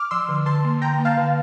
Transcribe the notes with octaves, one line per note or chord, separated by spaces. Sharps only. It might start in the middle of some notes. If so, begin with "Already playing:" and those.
Already playing: D6 F6
F3 C6 E6
D3
D3 A5 C6
A#3
D3 G5 A#5
A#3
F5 A5
D3